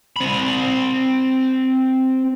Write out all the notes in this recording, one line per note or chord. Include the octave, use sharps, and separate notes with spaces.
C4 B5